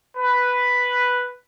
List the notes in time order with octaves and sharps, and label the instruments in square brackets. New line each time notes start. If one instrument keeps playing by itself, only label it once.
[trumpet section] B4